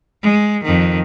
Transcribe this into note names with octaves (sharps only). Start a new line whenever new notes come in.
G#3
F2 D#3